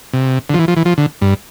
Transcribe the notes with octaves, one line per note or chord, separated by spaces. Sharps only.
C3
D3
F3
E3
F3
E3
F3
D3
G2